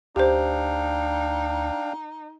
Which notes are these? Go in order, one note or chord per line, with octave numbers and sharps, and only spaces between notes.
D2 D4 D#4 G4 C5 F5 G5